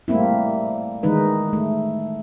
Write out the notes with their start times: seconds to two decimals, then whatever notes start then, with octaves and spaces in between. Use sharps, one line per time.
0.08 G3 A3 A#3 C4 E4
1.03 D#3 E3 G#3 D#4 B4
1.53 A3